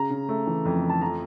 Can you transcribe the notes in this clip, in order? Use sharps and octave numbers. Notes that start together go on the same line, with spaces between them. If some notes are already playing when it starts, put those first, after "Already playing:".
Already playing: C#3 A#5
C#3
A3
E3
F2
A3
A5
F3 A#5